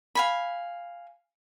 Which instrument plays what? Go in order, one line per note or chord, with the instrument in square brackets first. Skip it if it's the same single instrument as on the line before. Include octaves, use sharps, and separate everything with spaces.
[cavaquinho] F5 G#5 B5